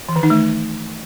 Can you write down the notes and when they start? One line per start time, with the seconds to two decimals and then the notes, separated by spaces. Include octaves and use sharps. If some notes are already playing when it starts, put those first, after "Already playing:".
0.09 E3
0.16 D#3
0.23 D#4
0.30 A3